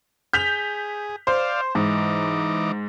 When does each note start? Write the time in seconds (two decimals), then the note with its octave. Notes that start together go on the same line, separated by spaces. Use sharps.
0.33 G#4 G6 B6 F7
1.27 C5 D5 F5
1.75 G#2 E3 D#4 D6